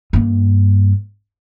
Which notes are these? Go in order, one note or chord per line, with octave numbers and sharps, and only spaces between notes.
G2 A#3